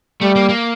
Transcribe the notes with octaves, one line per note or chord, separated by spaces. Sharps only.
G3 A3
A#3
A#3